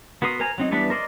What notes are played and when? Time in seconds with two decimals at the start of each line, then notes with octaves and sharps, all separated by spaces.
0.22 B3 F#4 A#4 C6 D#6
0.40 A#4 C5 G#5 A#5
0.58 F#3 C4 D#4
0.71 E3 G3 B3 D4 B4
0.90 A#4 C5 D5 D#5